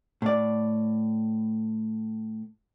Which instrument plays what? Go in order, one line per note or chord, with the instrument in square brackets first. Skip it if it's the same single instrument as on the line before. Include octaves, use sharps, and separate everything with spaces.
[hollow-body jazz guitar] A2 D5